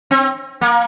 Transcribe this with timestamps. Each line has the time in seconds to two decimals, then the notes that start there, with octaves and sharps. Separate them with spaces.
0.11 C4
0.61 A#3